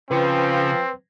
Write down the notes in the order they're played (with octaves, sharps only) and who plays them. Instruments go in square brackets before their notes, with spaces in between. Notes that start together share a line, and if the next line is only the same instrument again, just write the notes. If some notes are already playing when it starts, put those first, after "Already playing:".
[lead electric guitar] C#3 [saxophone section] F3 [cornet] C4 [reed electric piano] B4 G5